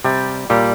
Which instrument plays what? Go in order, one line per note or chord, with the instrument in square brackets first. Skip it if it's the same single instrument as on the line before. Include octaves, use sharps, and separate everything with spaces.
[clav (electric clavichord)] C3 [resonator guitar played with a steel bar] G3
[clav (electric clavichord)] A#2 [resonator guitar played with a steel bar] G3